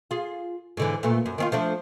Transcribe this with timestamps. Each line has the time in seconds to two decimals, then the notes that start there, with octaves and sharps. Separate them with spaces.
0.11 F4 G#4
0.77 G#2 D3 E3
1.03 A#2 A3 B3
1.26 F#2
1.38 D#3 C4 F4
1.52 F3 A3 D4